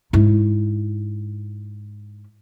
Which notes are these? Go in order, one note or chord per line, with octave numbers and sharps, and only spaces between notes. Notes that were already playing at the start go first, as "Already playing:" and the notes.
G#2 E4